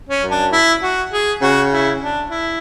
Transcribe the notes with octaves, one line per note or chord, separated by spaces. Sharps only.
C#4
F#2
D4
E4
F#4
G#4
C#3 F#4
E4
D4
E4